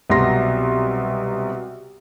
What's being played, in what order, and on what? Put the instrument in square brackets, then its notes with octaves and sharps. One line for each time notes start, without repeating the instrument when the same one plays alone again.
[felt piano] C2 B2 F#3 C6 A#6